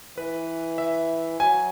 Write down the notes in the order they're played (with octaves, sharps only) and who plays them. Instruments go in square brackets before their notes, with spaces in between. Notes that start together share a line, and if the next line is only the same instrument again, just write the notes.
[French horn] E3 [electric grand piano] B4
[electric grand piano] E5
[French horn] F#3 [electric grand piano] G#5